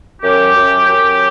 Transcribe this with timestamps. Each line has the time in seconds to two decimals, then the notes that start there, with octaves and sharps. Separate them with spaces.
0.22 F#2 G4
0.54 F#2
0.87 F#2